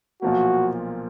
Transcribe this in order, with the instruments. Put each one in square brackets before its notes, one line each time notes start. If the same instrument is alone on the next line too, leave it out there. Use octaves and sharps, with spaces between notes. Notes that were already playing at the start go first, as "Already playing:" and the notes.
[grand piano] B1 A#2 F3 A#3 [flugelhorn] F#4